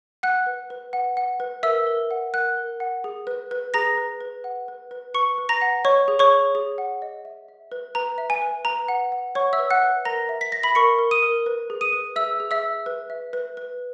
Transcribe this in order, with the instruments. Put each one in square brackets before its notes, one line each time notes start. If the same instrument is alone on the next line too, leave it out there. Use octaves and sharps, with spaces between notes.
[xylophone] F#5 F#6
B4
B4
F#5
F#5
B4
A#4 E5 E6
A#4
F#5
A#4 F#5 F#6
A#4
F#5
G#4
B4
B4
G#4 A#5 A#6
B4
B4
F#5
B4
B4
B4 C#6 C#7
B4
A#5 A#6
F#5
C#5 D#5 C#6
G#4
C#5 C#6
G#4
G#4
F#5
D#5
E5
E5
B4
B4 A#5
E5
G#5
B4
B4 A#5
F#5
F#5
C#5 F#5 C#6
E5 E6
B4
F#5 F#6
B4
A#4 A#5 A#6
E5
B6
E5 A#6
B5 B6
A#4 C#6 C#7
A#4
D#6 D#7
A#4
B4
G#4
D#6 D#7
B4
G#4 E5 E6
G#4
E5 E6
G#4
B4
E5
B4
B4